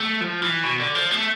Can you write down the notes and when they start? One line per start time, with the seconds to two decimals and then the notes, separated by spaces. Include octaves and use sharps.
0.01 A3
0.21 F3
0.43 E3
0.63 B2
0.80 D3
0.95 F3
1.11 A3